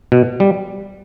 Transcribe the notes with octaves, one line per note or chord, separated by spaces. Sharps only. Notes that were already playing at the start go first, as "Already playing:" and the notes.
B2
G3